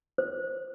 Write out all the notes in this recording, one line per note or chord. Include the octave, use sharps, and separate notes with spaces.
C5